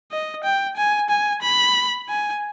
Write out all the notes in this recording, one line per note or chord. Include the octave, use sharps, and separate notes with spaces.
D#5
G5
G#5
G#5
B5
G#5